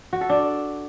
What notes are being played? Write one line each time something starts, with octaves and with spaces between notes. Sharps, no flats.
F#4
A4
D4